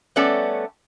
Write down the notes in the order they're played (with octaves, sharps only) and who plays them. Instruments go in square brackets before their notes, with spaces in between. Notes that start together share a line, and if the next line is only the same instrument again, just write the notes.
[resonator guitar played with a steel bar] G3 A3 B3 C#4 A4 D5